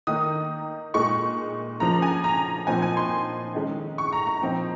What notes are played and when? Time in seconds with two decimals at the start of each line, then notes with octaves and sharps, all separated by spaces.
0.07 D#3 A#3 D#4 D#6
0.94 A#2 G#3 D#4 C#6
1.80 C#3 F3 A#3 A#5
2.02 G#5
2.24 A#5
2.67 A#2 F3 C4 D#4 G#5
2.82 G#5
2.97 C6
3.55 D#3 G#3 C#4
3.98 C#6
4.13 A#5
4.27 A#5
4.42 A#2 F3 C4 D#4